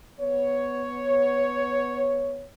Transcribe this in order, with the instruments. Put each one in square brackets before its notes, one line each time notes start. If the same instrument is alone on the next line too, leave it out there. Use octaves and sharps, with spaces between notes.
[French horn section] B3 C#5